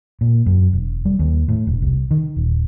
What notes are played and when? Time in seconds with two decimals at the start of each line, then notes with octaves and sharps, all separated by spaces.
0.21 A#2
0.46 F#2
0.73 E1
1.05 G3
1.19 D#2
1.49 A2
1.67 E1
1.82 C2
2.11 D#3
2.36 D#1